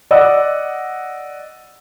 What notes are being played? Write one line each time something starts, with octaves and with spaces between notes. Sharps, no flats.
D5 D#5 F#5 E6